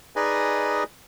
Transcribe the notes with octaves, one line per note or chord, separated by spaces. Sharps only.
D#4 G#4 B4 D5 D#5 G#5